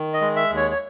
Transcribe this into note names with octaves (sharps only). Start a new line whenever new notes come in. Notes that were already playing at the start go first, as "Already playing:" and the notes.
Already playing: D#3
D#5
G#3
E5
D#2
C#5
C#5